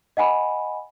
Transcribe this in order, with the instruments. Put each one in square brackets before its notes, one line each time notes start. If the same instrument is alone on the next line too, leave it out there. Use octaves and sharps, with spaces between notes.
[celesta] D#5 F#5 G#5 B5